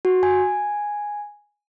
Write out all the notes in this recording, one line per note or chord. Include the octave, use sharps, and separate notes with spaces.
F#4
G#5